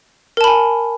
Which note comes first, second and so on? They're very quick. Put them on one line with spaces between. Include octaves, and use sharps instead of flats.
A#4 A5 B5 G#5